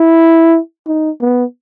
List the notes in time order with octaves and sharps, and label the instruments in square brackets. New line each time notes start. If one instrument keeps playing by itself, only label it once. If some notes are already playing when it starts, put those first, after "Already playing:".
Already playing: [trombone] E4
D#4
B3